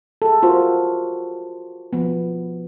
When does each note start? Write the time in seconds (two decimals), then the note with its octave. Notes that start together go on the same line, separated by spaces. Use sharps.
0.22 G#4 A4
0.43 F4 F#4 A#4 C5
1.93 F3 B3